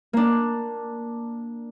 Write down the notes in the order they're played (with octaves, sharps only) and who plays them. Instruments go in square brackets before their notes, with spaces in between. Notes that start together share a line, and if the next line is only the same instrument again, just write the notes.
[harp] A#3 D4